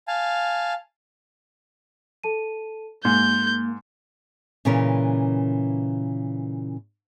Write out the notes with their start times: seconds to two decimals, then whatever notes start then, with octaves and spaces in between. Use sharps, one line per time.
0.08 F5 G#5 A5
2.24 A4 A5 D#7
3.05 G#2 A#3 C6 G6
4.65 A#2 C#3 E3 C#4 A#4 B4